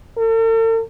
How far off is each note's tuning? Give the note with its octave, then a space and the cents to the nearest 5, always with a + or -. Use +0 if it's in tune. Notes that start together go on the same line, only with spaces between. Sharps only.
A4 +45